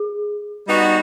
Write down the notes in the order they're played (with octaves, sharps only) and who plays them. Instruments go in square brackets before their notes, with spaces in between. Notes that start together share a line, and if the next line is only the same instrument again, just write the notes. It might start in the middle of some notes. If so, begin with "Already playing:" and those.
Already playing: [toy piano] G#4
[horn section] G3 B3 D#4 F#4